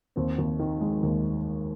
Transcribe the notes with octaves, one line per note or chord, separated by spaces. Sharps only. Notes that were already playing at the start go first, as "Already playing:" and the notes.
D#2 C4
D#2
D#3
G#3
D#2